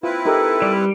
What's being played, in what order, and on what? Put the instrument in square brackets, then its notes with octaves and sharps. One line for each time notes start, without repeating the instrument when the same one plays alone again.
[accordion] C4 E4 B4 [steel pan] F4
[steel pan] D#4 G4 A#4 [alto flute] A4
[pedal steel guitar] G3 [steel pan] D5